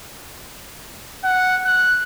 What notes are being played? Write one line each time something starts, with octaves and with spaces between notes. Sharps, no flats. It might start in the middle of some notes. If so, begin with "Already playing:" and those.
F#5
F#6